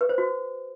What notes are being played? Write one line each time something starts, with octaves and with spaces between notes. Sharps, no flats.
B4
C5
F#4